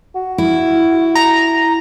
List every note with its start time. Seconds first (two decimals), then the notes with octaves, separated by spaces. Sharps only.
0.15 F#4
0.38 E4
1.15 A#5